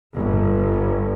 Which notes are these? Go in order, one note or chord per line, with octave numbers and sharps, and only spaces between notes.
G1